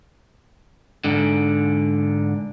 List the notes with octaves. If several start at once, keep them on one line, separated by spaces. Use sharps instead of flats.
G#2 D3